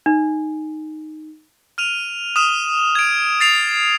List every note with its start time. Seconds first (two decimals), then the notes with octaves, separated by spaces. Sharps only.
0.06 D#4
1.78 F6 D#7 F7
2.36 D#6 F6 E7 F7
2.95 G#6 D7
3.40 A6 C7 F7